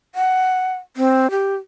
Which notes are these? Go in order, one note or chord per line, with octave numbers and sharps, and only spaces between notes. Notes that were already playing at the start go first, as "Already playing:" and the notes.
F#5
C4
G4